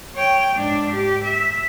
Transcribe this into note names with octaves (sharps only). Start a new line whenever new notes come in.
C#5 G5
G#2 D4
G4
E5